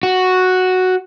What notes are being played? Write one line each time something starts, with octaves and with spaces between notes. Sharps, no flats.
F#4